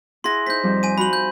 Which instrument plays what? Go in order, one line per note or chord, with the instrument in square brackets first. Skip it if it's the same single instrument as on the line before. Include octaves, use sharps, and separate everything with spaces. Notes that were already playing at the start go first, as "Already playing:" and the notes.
[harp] E4 G#4 F#5 [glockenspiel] C6 A#6
[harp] D#4 C5 [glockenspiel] G6 B6
[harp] F2 G3
[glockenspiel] G#5 D#7
[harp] F#4 C5 [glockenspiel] B5 F#7
[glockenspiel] G6